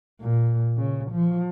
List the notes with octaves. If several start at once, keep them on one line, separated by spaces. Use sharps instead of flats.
A#2
C#3
F3